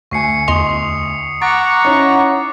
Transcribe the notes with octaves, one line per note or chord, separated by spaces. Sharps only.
D2 G#5 C#6 C7 C#7
E2 D#5 C6 D#6 F7
F#5 A#5 C#6 D6 A6 D7
C#4 D#4 E4